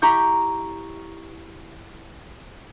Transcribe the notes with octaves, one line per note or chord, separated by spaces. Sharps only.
E4 G4 A#5 C#6 G6